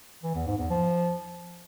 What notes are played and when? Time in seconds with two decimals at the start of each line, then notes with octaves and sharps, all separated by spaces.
0.24 E3
0.35 E2
0.47 G#2
0.59 E2
0.70 F3